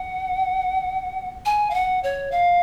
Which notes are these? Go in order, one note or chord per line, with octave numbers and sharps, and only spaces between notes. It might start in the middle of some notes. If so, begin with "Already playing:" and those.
Already playing: F#5
G#5
F5
F#5
C#5
F5